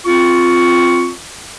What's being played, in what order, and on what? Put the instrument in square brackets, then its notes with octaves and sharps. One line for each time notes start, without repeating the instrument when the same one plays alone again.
[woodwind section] C4 F4 C#6